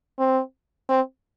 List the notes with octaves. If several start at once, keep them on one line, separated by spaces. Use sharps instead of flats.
C4
C4